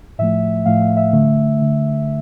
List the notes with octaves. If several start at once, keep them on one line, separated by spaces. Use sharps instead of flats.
A2 F3 A3 E5
A2 F3 A3 F5
F5
E5
D3 A3
D3 A3